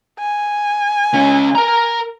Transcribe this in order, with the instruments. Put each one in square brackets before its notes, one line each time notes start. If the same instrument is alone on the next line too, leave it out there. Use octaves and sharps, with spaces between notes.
[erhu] G#5
[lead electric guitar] C#2 C#4
A#4 A#5